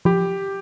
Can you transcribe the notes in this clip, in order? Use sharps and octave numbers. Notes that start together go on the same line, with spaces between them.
F3 G4